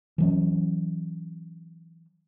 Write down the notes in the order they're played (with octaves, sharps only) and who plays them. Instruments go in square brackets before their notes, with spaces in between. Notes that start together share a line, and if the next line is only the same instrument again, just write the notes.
[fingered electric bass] E3 F#3 C#4